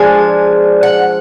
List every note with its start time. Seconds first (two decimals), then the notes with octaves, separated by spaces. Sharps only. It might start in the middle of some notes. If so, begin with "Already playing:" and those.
Already playing: F3 G#3 D4 G#5
0.83 F#5